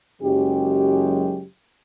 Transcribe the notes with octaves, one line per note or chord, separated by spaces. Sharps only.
F#1 F#2 F#3 G#3 C#4 G4